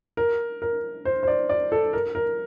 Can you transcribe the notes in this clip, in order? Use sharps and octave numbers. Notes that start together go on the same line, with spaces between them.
A#4
A#4
C5
C5
D5
D5
A4
A#4
A#4